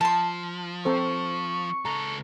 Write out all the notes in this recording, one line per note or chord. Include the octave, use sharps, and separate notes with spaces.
F3 A5 C6
C4 A4 C5 C#6
C#2 A4 A#5